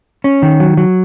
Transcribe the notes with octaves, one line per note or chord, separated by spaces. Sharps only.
C#4
D#3
F#3
F#3